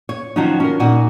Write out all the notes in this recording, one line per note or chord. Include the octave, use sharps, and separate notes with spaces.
C#5
D#3 F3 F#3 C#4 D#4
C#4 A#4
A#2 D#4 F#4